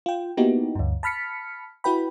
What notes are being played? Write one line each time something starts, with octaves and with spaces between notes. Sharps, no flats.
F4 G5
A#3 B3 D#4 E4 F#4 G4
D2 G2
A5 B5 F6 B6 C#7
E4 F#4 B4 G5 B5